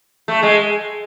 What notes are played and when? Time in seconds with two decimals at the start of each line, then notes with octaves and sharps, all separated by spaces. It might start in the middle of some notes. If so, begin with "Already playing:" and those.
0.28 A3
0.43 G#3